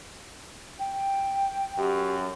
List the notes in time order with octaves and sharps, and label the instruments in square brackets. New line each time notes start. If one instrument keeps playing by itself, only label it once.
[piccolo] G5
[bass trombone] F#2 [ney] G4